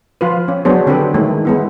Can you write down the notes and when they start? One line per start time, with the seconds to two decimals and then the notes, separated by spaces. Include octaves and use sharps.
0.21 F3 F4 B4
0.48 C#4
0.65 F#3 B3 C#4 D4 G#4 C5
0.87 D3 C4 G4 A4 B4
1.14 D#3 E3 G#3 A3
1.45 G#3 B3 E4